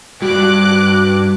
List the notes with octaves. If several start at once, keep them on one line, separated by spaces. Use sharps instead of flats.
G2 F#4 D6 F#6